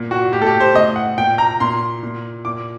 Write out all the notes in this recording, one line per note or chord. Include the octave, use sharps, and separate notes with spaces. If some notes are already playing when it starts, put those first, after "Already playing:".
Already playing: A#2
F#4
A2 G4
A4
G4
C5
A2 D#5
F#5
A#2 G5
A#5
A#2 C6
A#2
A#2 D6